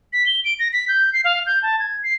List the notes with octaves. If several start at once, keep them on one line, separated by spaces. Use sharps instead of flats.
B6
G7
D7
A#6
B6
G6
C7
F5
G6
A5
G#6
C7